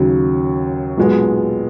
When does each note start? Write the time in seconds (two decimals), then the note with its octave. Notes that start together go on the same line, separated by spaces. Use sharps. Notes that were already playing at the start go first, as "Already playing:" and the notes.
Already playing: D#2 C#3 F#3
0.98 B1 A#2 G#3 B3